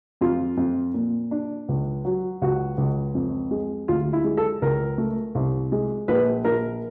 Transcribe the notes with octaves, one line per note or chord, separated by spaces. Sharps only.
F2 F4
F2
A#2
D4
C#2
F#3
C#2 F#4
C#2
F2
G#3
D2 F4
E4
G#3
A4
C#2 A#4
A3
C2
G#3
A#1 B4
A#1 A#4